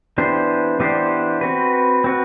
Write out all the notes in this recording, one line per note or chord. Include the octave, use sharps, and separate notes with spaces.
E3 B3 D4 G4 C5
E3 B3 D4 G4 C5
C4 F#4 B4
C4 F#4 B4